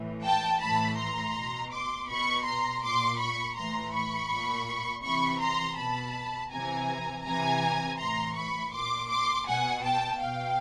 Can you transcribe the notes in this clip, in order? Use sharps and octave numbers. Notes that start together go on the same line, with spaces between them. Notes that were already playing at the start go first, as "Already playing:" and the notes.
Already playing: A2 E3
G5 A5
A2 E3 A5 B5
A#5 C6
B2
C6 D6
B2 B5 C#6
A#5 C6
A#2 C6 D6
B5 C#6
A2 E3 A#5 C6
B5 C#6
A#2
C3 E3 B5 C#6
A#5 C6
B2 A5 B5
C3 E3 G#5 A#5
C3 E3 G#5 A#5
A2 E3 A#5 C6
B5 C#6
A#2 C6 D6
C6 D6
B2 F#5 G#5
G5 A5
B2 F5 G5